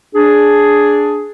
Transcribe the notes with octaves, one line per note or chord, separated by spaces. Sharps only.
D4 G#4